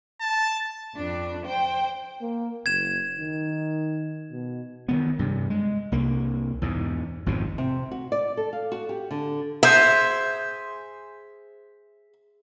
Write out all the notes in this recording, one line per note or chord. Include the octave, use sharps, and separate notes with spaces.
A5
F2 D4
C5 G5
A#3
F#1 G#6 E7
D#3
B2
D#3 E3 B3
G2 C3
G#3
C2 A#3
E2 G#2 B2
G#1 F2 G#2 B2
C3
F#4
D5
A4
F5
F#4
G4
D3
G#4 C5 E5